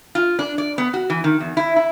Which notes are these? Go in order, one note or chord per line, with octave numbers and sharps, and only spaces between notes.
F4
D4
D5
B3
F#4
E3
D#3
E2
E4
E4